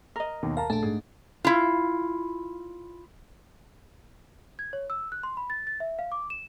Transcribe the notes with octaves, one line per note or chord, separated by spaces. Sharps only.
A#4 D#5
D#2 B2 D#3
A#4 F5 A5 A#5
A#1 A3 D4 A5
G#2 G#4
E4 F4
G#6
C#5
E6
F#6
C6
B5
A6
A6
E5
F5
D6
E7